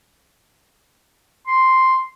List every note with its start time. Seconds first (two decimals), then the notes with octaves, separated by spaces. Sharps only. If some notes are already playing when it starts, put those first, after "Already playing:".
1.47 C6